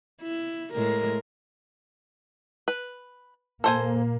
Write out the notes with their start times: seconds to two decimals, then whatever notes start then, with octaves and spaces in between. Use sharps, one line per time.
0.22 E4
0.73 A2 G#3 A#4
2.68 B4
3.64 A#2 A#3 A4 C5 G#5